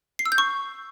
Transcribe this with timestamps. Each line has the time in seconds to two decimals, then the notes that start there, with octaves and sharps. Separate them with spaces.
0.19 C7
0.26 E6
0.32 G6
0.38 C#6